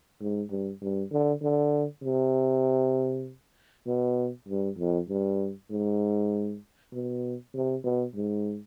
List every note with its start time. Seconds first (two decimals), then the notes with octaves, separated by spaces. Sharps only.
0.21 G#2
0.51 G2
0.81 G2
1.11 D3
1.42 D3
2.04 C3
3.86 B2
4.48 G2
4.78 F2
5.09 G2
5.71 G#2
6.92 B2
7.54 C3
7.84 B2
8.15 G#2